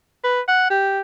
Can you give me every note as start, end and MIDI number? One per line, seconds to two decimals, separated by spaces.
0.24 0.41 71
0.48 0.68 78
0.70 1.01 67